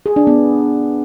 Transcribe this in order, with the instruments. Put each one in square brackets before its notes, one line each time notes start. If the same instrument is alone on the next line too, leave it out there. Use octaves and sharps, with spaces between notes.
[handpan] G#4
D4
B3